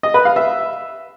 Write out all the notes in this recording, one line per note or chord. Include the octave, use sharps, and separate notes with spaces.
D#5
B4
F5
E5